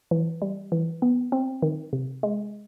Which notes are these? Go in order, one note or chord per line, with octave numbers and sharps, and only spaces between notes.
E3
G3
E3
B3
C4
D#3
C3
G#3